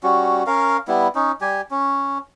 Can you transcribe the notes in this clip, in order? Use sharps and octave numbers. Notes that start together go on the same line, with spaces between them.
G3 C#4 F#4
C#4 A#4 F5
G3 B3 E4
C#4 D#4
G3 G4 G#5
C#4